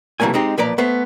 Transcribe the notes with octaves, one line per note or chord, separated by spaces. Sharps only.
C3 E3 F#3 A3 A#3 G#5
G#3 C4 D#4 G4
B1 A#2 F3 B4 D5 A#5
A3 B3 C5